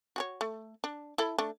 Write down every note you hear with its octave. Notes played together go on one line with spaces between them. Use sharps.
F#4 G#4 C#5
A3
D4
E4 A4 B5
A3 D4